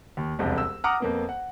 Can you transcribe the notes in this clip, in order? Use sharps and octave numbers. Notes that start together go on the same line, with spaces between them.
D#2
E1 C2 F2
E6
F#5 A#5 D6 D#6 F6
F2 A#3 B3
F#5